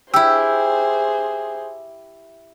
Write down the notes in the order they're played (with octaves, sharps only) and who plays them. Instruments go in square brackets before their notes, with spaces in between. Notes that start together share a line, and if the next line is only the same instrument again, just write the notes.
[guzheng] E4 G4 [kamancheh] G#4 C5 [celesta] G5 E6